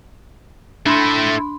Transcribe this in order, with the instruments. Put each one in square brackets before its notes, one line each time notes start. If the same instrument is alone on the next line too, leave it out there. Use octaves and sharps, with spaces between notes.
[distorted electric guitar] A3 E4 [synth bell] D4 B5 C6